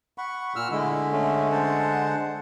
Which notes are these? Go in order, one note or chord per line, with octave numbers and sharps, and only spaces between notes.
F#5 B5 C#6
A#2 E6 F6
D3 G#3 A3 E4 B5
A3 C#4
C5 F#5 A5